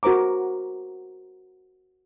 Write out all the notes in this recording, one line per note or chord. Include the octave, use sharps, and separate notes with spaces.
F#4 A#4 C5 A#5 D6